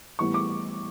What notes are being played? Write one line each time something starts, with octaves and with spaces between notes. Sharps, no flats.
A2 E3 G3 B3 C#6
D6